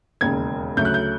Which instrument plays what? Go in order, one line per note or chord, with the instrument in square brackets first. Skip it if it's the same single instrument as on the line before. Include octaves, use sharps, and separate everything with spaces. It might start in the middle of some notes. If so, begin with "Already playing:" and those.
[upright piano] E1 D#2 C#3 G#6
D2 C#3 F#3 A3 G6
F#6
G6